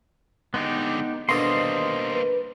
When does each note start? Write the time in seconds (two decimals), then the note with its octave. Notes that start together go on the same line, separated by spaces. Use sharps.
0.54 D3 G#3 B3 D#4 G4
1.29 B2 G3 A#3 D4 A4 C5 D#5 C6
2.13 B4